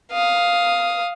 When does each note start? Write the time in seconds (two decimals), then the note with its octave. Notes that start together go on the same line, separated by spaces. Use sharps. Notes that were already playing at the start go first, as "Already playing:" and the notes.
0.12 F5 D#6